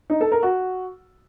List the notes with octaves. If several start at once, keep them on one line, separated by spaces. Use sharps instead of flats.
D#4
A4
A#4
F#4